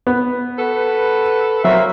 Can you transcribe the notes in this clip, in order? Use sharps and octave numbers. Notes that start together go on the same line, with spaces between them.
B3
F#4 A4 B4
F#3 A#3 C4 E5